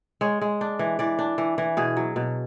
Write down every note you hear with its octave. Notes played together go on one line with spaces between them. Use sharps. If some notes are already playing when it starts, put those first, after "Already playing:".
G#3 C#5
G#3
D4
E3
E3 D5
D4
E3
E3
B2 G#4
F#3
B2